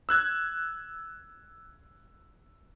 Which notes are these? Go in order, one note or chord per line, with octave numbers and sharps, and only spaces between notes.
E6 F#6 G#6